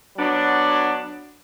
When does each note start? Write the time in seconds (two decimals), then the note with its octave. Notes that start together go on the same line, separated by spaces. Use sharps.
0.17 F#3 B3 D4